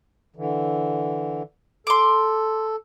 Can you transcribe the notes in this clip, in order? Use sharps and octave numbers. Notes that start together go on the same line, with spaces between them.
D3 E3
A4 C6 D6